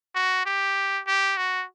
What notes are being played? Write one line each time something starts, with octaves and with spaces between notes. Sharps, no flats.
F#4
G4
G4
F#4